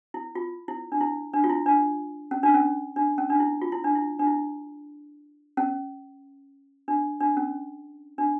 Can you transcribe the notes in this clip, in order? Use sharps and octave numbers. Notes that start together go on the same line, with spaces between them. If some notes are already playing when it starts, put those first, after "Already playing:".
E4
F4
E4
D4
E4
D4
F4
E4
D4
C#4
D4
C#4
D4
C#4
D4
E4
F4
E4
D4
E4
D4
E4
C#4
D4
D4
C#4
D4